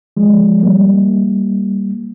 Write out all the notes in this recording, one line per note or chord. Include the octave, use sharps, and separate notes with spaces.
F3 G#3
G3 A#3